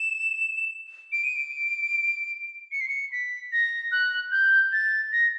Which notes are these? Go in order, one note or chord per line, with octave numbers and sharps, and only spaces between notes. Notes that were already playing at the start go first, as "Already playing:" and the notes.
Already playing: E7
D7
D#7
D7
C#7
C7
C#7
B6
A#6
F#6
G6
A6
A#6